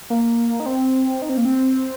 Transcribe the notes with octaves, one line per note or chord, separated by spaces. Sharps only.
A#3
D#4
C4
D#4
C4
A#3
C4